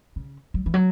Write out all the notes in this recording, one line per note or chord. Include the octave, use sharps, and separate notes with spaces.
C#3
F#3
E3
F#3